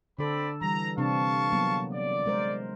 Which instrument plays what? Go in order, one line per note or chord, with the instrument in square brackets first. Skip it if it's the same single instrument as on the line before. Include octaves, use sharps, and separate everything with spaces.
[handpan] D3 A4 [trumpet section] C4 D5 B5
[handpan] E3 G3 [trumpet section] A#5
[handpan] C3 C4 D4 [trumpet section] F5 A5 C#6
[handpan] F#3 A#3 B3
[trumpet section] D5
[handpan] G#3 A#4 C5